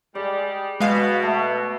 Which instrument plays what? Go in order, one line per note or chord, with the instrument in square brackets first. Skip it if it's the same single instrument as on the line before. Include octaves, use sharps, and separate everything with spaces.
[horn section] G3 G#3 G4 [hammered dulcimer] D5
[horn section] B2 [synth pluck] G#3 F5
[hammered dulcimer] A3